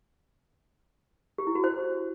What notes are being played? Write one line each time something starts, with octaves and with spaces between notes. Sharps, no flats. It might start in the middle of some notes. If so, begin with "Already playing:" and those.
G4
E4
F#4
C5